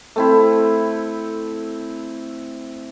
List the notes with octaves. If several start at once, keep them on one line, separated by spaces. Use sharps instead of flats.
A3 C4 E4